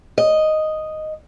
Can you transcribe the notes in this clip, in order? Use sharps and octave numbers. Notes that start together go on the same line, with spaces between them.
D#5